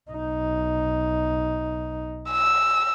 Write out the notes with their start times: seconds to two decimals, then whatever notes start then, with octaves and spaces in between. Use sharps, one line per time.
0.11 B1 D#4
2.31 E6